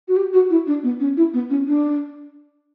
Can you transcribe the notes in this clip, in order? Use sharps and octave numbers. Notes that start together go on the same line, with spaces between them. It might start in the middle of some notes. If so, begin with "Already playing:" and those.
F#4
G4
F#4
E4
D4
B3
C#4
E4
B3
C#4
D4